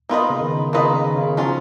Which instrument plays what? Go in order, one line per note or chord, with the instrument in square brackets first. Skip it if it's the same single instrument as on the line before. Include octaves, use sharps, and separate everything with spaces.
[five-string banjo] A#3 F4 B4 D#5 [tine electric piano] B3
[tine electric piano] C#3
D#3
[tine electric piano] C#3 [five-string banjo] A#3 F4 B4 D#5
[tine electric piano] D#3
C#3
[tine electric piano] F3 [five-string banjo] F#3 C#4 F4